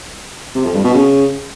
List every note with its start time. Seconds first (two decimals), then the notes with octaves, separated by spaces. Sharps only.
0.55 C3
0.64 F2
0.74 G2
0.84 B2
0.94 C#3